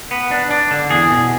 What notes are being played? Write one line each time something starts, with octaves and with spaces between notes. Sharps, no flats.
B3
D4
D4
D3
E2 G#4
B2